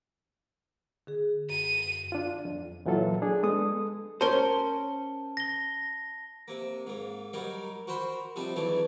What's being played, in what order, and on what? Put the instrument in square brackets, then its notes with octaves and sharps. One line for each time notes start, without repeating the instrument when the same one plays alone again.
[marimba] D3 G#4
[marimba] F#2 [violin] D#7
[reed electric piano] D4 F4
F2
A#2 E3 F#3 F4 A4
D4 G#4
G#3 B3 A4 D#6
[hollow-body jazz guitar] C#4 A#4 C5 [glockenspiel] A5 G7
[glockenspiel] A#6 G7
[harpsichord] C3 A#3
G#2 A#3
F#3 G3 D#4 A#4
F#4 A#4 C5 F#5 B5 C6
C3 F3 G3 D4 D#4
E3 F#3 A3 D4 G#4